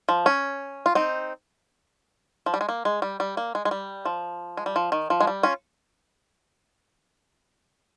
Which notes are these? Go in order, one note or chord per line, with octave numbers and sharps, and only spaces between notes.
F3
C#4
F4
C4 D#4
F3
G3
G#3
A#3
G#3
G3
G3
A#3
G#3
G#3
G3
F3
G#3
G3
F3
D#3
F3
G#3
G3
C#4 F4